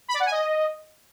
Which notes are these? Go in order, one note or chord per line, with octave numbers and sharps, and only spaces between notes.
B5
D5
F#5
G#5
D#5